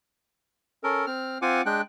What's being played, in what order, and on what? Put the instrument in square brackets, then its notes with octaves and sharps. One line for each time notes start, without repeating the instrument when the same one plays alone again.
[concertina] C#4 A4 A#4
C4 F6
C4 F4 F#5 G#5 D6
G#3 D4 G5 F#6